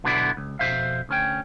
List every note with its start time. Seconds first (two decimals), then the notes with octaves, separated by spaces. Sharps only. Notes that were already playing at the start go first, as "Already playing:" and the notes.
0.04 B1 B2 D3 B3 E4 D5
0.37 C#2
0.59 F2 B2 C5 E5 F5
1.09 D2 C#4 G5